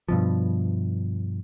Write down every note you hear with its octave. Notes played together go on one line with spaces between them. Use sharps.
G2 B2 F3